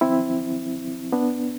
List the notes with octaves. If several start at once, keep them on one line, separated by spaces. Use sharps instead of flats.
C4 E4
B3 D4